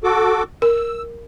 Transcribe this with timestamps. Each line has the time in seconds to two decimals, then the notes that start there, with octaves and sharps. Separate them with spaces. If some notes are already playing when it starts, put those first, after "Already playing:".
0.04 F#4 A4 D6
0.62 A#4 E6